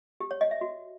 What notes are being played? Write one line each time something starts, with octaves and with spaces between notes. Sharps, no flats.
G4
C#5
D#5
E5
F#4